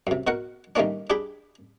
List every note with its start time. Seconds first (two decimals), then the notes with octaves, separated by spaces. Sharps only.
0.07 F#2 C3
0.27 B2 F#4 A#4 F#5
0.76 D#3 G3 A3 A#3 C#4 D4
1.10 D4 G4 G#4 G5 B5